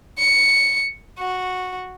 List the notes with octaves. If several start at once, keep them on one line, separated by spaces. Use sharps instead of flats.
C#7
F#4